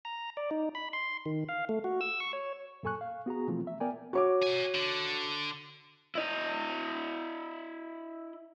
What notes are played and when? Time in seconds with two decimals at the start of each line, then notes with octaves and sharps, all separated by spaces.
0.05 A#5
0.37 D5
0.51 D#4
0.75 B5
0.93 C6
1.26 D#3
1.49 F5
1.69 A3
1.84 F#4
2.01 E6
2.20 C#6
2.33 C#5
2.83 F#2 A#2 A4 G#5 C#6 F#6
3.01 F5
3.26 B3 F#4 G#4 A#5
3.47 B2 E3 F3 A3 C4 F4
3.67 E5
3.80 B3 A#4 D5 G5 G#5
4.13 F#4 C#5 D6
4.42 A#3 G#5
4.75 D3
6.15 E4 D#5